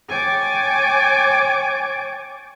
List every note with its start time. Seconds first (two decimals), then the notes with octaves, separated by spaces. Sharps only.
0.10 C#5 G5 G#5 D6 A6